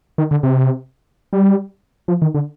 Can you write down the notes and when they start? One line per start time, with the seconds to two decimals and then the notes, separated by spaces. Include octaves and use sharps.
0.18 D#3
0.31 D3
0.43 C3
1.33 G3
2.08 F3
2.22 D#3
2.34 D3